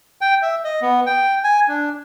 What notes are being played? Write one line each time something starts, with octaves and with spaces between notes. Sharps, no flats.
G5
E5
D#5
B3
G5
G#5
D4